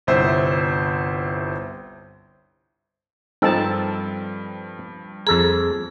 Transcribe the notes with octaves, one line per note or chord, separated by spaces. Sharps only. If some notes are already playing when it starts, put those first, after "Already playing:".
G1 C2 C5 E5 E6
G2 F3 C4 D#4 A4 A5
F2 G#4 A4 A#5